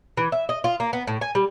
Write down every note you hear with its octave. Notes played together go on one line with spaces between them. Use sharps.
E3
E5
D#5
F4
A#3
B3
A2
G#5
G3